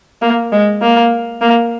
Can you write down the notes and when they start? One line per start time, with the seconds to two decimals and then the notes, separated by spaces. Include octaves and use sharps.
0.22 A#3
0.52 G#3
0.82 A#3
1.41 A#3